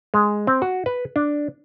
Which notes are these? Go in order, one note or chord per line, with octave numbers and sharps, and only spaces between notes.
G#3
C4
F#4
B4
D4